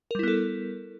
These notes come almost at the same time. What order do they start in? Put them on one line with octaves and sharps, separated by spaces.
A#4 G3 E4 B3 A4